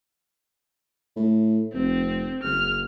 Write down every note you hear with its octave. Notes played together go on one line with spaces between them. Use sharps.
A2
F1 C4
F#1 F6